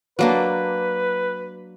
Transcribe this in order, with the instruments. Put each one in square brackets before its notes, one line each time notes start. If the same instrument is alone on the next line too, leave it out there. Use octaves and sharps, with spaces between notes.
[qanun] F#3 A#3 D4 [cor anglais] B4